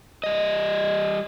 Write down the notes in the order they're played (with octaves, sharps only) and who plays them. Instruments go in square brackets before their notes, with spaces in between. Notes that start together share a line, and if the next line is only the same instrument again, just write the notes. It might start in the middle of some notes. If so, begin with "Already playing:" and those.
[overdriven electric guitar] G3 D#5